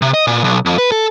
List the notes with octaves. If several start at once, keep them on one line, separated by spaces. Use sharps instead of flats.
C3
D#5
A#2
B1
F2
B4
A4